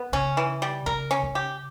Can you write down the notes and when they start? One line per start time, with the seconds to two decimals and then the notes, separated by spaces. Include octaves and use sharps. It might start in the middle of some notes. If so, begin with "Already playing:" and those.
Already playing: B3
0.12 C#3 C#4
0.37 E3
0.62 G3
0.86 C#3 A#4
1.11 C#4
1.23 C#3
1.35 G4